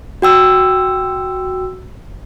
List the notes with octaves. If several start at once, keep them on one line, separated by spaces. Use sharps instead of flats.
F#4 G5 E6